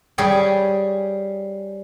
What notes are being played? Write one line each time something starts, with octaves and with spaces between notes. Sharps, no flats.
G3 G#4 C#5 G5